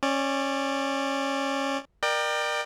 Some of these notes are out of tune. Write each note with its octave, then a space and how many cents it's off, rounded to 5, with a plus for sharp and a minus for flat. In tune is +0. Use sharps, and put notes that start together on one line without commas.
C#4 -20 D5 +0
A#4 +15 D5 +35 G5 +0